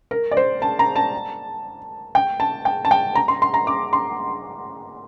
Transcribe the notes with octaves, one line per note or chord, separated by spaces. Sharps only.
A#4
D5
C5
A5
A#5
A5
G5
A5
G5
A5
G5
A#5
C6
C6
A#5
D6
C6